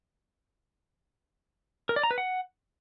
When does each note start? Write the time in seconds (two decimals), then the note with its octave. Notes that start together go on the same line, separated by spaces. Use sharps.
1.89 A#4
1.96 D5
2.03 A#5
2.11 B4
2.18 F#5